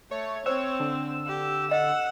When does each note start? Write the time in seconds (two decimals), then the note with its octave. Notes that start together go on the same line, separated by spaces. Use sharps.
0.11 A3 C#5
0.46 C4 C5 C#5 E6
0.80 D3
1.27 G4
1.71 D#5 F#5